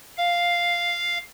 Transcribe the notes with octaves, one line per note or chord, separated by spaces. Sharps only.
F5